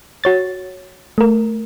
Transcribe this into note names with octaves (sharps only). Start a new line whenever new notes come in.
F#4 C#5 A6
A3 A#4